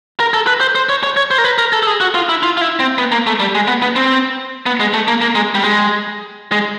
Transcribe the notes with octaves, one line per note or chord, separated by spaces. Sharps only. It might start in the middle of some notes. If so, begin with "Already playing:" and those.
A#4
A4
B4
C5
C5
C#5
C#5
C#5
C5
A#4
B4
A#4
A4
A4
G#4
F#4
F4
E4
F4
F4
E4
C4
B3
A#3
A3
G3
G#3
B3
B3
C4
B3
G#3
A3
A#3
A#3
G#3
G3
G#3
G#3